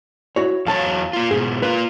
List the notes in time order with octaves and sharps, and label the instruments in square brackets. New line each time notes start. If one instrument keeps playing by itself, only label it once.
[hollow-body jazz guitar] E4 F#4 C#5
[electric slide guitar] E2 F#3 C#5 [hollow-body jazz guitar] F5 A5
[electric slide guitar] A#3 F4
[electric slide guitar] G#2 B2 [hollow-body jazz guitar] G#4
[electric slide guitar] A#3 F4 [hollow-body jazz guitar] B4